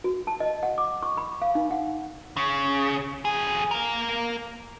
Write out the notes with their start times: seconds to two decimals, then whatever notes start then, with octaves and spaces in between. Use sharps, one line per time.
0.04 F#4
0.27 A5
0.40 D#5
0.63 F#5
0.78 D6
1.02 C#6
1.17 B5
1.42 F5
1.55 D#4
1.71 F#5
2.37 C#3
3.25 F2 G#4
3.71 A#3 A#4